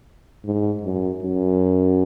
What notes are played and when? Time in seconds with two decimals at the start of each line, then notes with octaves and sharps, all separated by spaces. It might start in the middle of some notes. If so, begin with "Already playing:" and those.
0.45 G#2
0.83 F#2
1.22 F#2